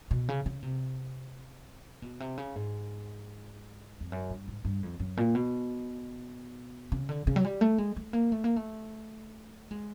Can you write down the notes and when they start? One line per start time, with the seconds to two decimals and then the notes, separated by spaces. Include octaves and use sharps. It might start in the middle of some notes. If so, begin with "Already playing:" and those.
0.11 B2
0.29 C#3
0.46 C#3
0.62 C3
2.02 B2
2.20 C3
2.38 C#3
2.56 G#2
4.01 F2
4.12 F#2
4.30 G2
4.48 G#2
4.65 G2
4.83 F2
5.00 F#2
5.17 A#2
5.35 B2
6.92 C#3
7.09 D3
7.27 C#3
7.36 F#3
7.45 G3
7.61 A3
7.78 G#3
7.96 A3
8.13 A#3
8.32 A3
8.44 A#3
8.56 A3
9.71 G#3